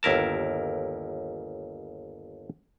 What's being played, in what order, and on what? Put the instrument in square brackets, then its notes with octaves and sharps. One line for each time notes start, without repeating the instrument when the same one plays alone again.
[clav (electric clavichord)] G1 D#2 E4 A#4 A5